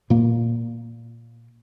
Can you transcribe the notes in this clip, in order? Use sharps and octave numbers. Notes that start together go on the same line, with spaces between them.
A#2 A#3